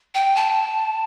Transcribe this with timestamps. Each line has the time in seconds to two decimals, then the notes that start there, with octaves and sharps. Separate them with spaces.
0.15 G5
0.36 A5